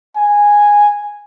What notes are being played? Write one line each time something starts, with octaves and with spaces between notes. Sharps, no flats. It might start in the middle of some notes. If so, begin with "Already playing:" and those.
G#5